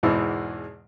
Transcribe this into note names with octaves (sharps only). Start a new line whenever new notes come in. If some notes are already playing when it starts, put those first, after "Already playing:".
E2 G#2 B2 E3 G#3